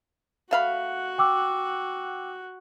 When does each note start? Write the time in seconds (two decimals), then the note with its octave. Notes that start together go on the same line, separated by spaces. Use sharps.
0.51 A3 F#4 F5 F#5 B5
1.18 G5 D6 E6